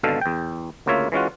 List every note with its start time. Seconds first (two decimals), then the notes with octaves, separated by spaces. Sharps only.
0.03 G#1 B2 D3 A4 F5
0.21 E2 G5
0.86 D2 C#3 A#3 F4 C#5 E5
1.12 E3 G#3 C#4 F4 F#4